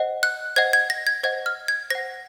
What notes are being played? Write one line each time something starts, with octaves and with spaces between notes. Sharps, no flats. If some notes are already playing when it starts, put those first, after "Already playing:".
Already playing: C5 D#5 F#5
F#6
C5 D#5 F#5 G#6
G#6
A#6
G#6
C5 D#5 F#5 G#6
F6
G#6
C5 F#5 A#6